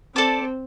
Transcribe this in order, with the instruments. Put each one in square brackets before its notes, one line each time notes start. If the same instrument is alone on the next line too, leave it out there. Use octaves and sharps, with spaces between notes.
[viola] C4 [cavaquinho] A4 D5 A5 D6